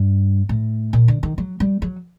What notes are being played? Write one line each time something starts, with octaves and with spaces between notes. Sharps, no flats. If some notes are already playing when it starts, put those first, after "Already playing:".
Already playing: G2
A2
A#2
D3
D#3
F#3
G3
F#3